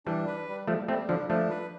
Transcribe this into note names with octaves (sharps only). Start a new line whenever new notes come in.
E3 G3 D4
B4
G3
F3 G3 A3
G3 A3 C4
D3 F3 D4
F3 A3 D4
B4